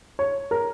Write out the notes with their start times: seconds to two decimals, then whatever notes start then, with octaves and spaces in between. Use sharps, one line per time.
0.19 C#5
0.51 A#4